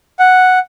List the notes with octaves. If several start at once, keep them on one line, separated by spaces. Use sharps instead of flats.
F#5